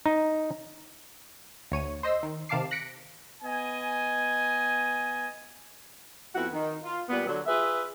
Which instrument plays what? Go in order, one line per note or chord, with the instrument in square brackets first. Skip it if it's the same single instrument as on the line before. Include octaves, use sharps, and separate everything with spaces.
[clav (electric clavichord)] D#4
[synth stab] D2 C#5 D#7
C5 D#5 C6 E6
D#3
C3 D#3 F5 A5 D6 C7
F#6 A#6 B6 C#7 D7
[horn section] B3 D#5 G#5
[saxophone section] F2 B3 E4 F#4 F#5
D#3
F4
A#2 G3 B3
D3 F#3
F4 G#4 B4 E5